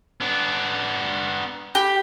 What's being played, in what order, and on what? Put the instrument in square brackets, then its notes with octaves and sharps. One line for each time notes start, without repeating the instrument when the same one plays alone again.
[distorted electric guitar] B3 D4
[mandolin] G4